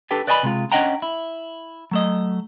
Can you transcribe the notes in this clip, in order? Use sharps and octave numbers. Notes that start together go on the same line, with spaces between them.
D4 G4 A4 B4 G5
B4 D5 D#5 G#5 A#5 B5
C3 G#3 F4
C#4 D4 D#5 F#5 G5 A#5
E4
F#3 A3 D#5